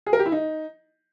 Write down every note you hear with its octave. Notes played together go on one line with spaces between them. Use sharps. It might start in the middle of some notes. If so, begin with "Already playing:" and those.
G#4
A#4
G4
E4
D#4